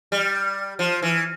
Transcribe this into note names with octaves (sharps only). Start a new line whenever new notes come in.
G3
F3
E3